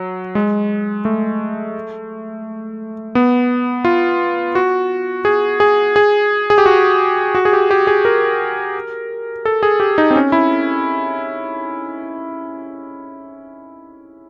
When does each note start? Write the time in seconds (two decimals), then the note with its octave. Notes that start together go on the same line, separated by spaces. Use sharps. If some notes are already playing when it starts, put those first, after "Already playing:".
Already playing: F#3
0.35 G#3
1.05 A3
3.15 B3
3.85 F4
4.55 F#4
5.25 G#4
5.60 G#4
5.96 G#4
6.50 G#4
6.58 G4
6.66 F#4
7.35 F#4
7.45 G#4
7.53 G4
7.71 G4
7.87 G#4
8.05 A#4
9.45 A4
9.63 G#4
9.80 G4
9.98 D#4
10.11 C4
10.16 C#4
10.32 E4